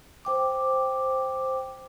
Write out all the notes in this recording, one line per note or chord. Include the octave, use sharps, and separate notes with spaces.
C5 G5 D6